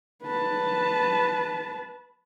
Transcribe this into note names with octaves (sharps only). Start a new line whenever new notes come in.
B4 A5